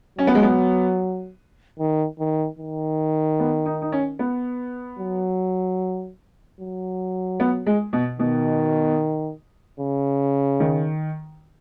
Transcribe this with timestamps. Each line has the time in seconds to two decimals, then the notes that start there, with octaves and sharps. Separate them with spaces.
0.19 F#3 C#4
0.27 B3
0.35 G#3
0.43 B3
1.79 D#3
2.19 D#3
2.59 D#3
3.39 B3
3.66 D#4
3.82 D#4
3.92 C#4
4.19 B3
4.99 F#3
6.60 F#3
7.40 B3
7.66 G#3
7.93 B2
8.19 B2 D#3
9.80 C#3
10.60 D#3